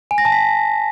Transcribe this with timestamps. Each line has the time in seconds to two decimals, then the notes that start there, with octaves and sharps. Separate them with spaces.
0.11 G#5
0.18 A#6
0.25 A5
0.32 B6